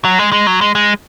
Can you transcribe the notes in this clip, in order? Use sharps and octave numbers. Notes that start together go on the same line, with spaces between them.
F#3
G#3
G#3
F#3
G#3
G#3